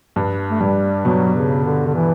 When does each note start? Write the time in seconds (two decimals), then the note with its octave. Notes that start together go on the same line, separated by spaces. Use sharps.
0.16 G2
0.51 A3
0.60 G2 G3
1.05 B2 F#3
1.35 C#3
1.65 D3
1.87 D3
1.95 E3